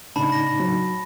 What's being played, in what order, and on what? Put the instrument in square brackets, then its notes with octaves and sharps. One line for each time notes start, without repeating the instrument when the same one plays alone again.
[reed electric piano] A2 C#3 D#4 [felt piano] D4 [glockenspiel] A5 B5
[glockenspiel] A#6
[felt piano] F#3